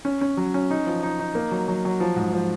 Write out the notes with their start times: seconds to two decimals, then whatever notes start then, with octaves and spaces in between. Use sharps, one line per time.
0.05 C#4
0.21 C#4
0.37 F#3
0.54 C#4
0.71 D#4
0.87 F3
1.03 D#4
1.20 D#4
1.35 A#3
1.51 F#3
1.68 F#3
1.85 F#3
2.00 F3
2.16 G#2
2.33 F3